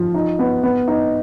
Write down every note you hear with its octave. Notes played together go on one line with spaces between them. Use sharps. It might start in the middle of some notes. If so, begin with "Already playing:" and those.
Already playing: F3
D#4
B3
B3
D#4